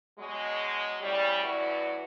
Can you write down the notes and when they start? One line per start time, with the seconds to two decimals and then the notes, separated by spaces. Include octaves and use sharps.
0.19 B2 F#3 G#3
1.02 A2 C#3 G3
1.43 F#2 A2 E3 F#4 D5